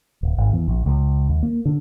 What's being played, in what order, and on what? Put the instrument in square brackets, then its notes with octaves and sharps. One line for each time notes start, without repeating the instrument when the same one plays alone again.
[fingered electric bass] D1
G#1
E2
A#1
C#2
D#2
A#3
D3